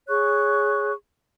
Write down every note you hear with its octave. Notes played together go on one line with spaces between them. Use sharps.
G#4 C#5 C#6 F#6